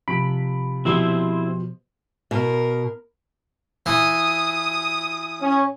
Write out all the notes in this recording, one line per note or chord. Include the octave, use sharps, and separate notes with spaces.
C3 F3 B5 D7
B2 F3 C4 E4 G4 C5 C6 D#6
B2 A#4
E3 D#6
C#4